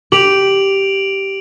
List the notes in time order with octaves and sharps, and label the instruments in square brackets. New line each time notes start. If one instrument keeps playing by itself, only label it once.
[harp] G4 [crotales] D7 F7 F#7